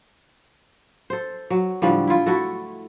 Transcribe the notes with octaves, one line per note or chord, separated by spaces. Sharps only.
A4 C5
F#3
A2 D3 F3 G3
E4 F4
A3 E4 F#4 A4